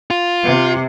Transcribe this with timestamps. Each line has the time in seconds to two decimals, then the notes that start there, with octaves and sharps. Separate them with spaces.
0.11 F4
0.44 C3